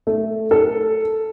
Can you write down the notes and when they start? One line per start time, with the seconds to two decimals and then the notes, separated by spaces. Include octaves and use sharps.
0.07 A3
0.51 A4